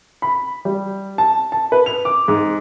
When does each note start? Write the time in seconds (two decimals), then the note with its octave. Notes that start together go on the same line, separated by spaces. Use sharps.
0.22 B5
0.65 G3
1.18 A5
1.52 A5
1.72 B4
1.86 F7
2.05 D6
2.28 G#2